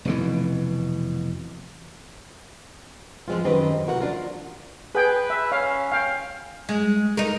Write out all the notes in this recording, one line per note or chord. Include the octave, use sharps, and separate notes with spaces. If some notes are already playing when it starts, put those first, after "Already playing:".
F1 B2 E3
F3 G#3 C4 F4
F#2 D#3 C4 G4 B4 D#5
C3 E3 F#4 A#4 C5 F#5
D4 F4 A#4
G#4 B4 G5
E5
C#4 F5
F5 G5
G#3
D#4 A#4